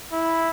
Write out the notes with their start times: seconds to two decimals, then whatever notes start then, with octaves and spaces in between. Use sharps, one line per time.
0.12 E4